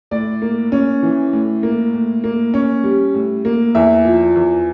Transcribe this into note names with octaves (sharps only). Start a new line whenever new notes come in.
A2 D5
A#3
C#4
E3
A2
A#3
A2
A#3
C#4
G3
A2
A#3
E2 E5
F3
E2